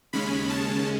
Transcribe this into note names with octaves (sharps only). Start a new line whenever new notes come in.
D#2 C#3 G#3 C#4 B5
A5